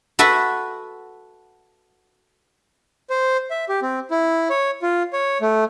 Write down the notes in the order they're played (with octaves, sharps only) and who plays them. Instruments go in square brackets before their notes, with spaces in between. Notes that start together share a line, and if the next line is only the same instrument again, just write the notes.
[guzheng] F#4 A4 B4 E5
[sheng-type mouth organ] C5
E5
G4
C4
E4
C#5
F4
C#5
A3